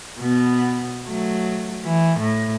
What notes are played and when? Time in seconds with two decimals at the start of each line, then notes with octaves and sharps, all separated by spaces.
0.19 B2 B3
1.08 F#3 A3
1.85 E3
2.19 A2